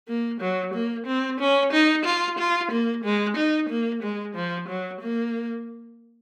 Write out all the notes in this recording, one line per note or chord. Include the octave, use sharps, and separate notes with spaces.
A#3
F#3
A#3
C4
C#4
D#4
F4
F4
A#3
G#3
D#4
A#3
G#3
F3
F#3
A#3